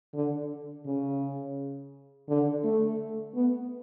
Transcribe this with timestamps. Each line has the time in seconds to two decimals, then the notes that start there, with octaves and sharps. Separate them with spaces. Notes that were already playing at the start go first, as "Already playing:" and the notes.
0.14 D3
0.85 C#3
2.29 D3
2.64 A3
3.35 B3